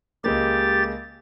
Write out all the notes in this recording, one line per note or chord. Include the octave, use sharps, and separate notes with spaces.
C#2 G#3 A#3 G4 A6